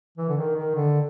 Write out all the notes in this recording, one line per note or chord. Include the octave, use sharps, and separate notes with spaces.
E3
D3
D#3
D#3
D3